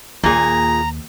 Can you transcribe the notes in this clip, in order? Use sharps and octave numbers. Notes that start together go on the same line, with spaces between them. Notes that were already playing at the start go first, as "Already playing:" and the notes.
D#2 A#2 G#4 A#5